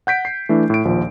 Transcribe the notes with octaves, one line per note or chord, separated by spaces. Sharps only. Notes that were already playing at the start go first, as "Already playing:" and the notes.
F#5 G6 B6 D7
C7
E3 A3 D4 E4
A2 D7
A#1 D#2 F3